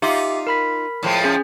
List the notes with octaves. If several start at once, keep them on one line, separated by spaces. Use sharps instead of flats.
D#4 F4 G4 E5 D6
A#4 B5 B6
A2 F3 G#3
C#4 G#4